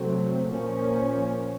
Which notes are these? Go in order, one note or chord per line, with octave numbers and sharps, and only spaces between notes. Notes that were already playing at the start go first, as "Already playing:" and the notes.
Already playing: C3 F#3 A3 C4
A#2 F3 A#3 C#4